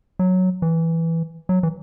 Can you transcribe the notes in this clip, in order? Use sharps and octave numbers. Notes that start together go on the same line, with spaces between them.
F#3
E3
F#3
E3